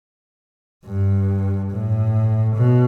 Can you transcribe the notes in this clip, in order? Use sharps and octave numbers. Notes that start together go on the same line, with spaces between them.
G2
A2
B2